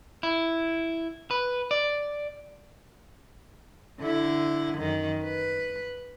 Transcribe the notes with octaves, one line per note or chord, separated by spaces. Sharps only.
E4
B4
D5
D3 E4
F#2 D#3
B4